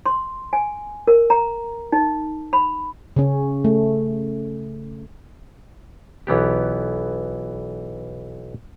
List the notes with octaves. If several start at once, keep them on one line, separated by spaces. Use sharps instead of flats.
C6
G#5
A#4
A#5
D#4
B5
C#3 C#4
A3
B1 E3 B3 G4